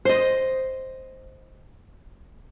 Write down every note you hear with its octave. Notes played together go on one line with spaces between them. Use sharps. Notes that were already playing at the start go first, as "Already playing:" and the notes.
C5 D#5